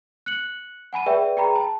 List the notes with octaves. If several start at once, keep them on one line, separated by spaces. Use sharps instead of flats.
F#6 C#7 F#7
F#5 G#5 B5 D#7
G#4 B4 D5 E5 G5
G#4 G5 A#5 B5
A5